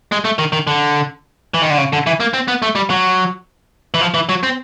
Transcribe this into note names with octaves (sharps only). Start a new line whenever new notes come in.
G#3
A3
D#3
D#3
D3
E3
D#3
D3
C#3
D3
E3
A#3
C4
B3
A3
G3
F#3
E3
F3
E3
F#3
C4